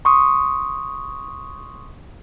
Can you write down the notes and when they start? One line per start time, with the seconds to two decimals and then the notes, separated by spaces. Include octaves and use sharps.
0.05 C6 C#6 D#6